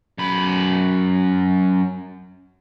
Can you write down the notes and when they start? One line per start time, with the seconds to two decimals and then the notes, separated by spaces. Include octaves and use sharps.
0.18 F#2 B5